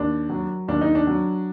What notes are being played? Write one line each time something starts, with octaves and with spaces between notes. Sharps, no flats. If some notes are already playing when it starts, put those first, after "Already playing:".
Already playing: D#2 D4
F#3
D#2 D4
D#4
D4
F#3